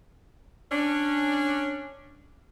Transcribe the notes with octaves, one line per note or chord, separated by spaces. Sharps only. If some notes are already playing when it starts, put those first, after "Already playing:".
C#4 D4